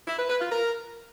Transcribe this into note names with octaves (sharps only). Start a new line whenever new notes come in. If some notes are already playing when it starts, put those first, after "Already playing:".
E4
B4
B4
F4
A#4